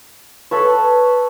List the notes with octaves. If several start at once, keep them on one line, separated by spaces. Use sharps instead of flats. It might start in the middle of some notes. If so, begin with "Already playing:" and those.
A4 B4 C#5